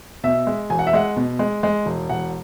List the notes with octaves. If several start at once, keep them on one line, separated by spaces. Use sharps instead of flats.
B2 E5
G#3
E1 G#5
F#5
E5
G#3 F#5
B2
G#3
G#3
E1
E1 F#5